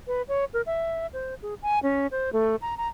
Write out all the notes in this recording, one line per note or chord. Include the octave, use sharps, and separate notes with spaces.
B4
C#5
A#4
E5
C5
G#4
G#5
C#4
C5
A3
A#5
A#5